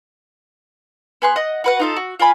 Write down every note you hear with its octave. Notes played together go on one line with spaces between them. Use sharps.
B3 G#4 C6 F#6
D#5 F#5
F#4 B4 F#5
D#4 F4 A4
F#4
F4 D5 G#5 B5